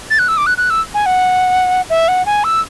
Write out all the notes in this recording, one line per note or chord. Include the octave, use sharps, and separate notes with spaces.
A6
F#6
E6
D6
F#6
F#6
E6
G#5
F#5
E5
F#5
G#5
E6